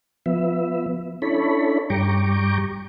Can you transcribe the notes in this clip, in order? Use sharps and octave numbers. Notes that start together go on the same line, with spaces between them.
F3 B3 E5
C#4 D4 E4 A4 C#5 B5
G2 G3 G5 A#5 C#6 D6